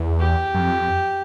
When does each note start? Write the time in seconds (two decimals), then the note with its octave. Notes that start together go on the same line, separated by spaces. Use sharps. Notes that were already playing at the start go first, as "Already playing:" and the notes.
Already playing: E2
0.19 G4
0.54 F#2
0.60 F2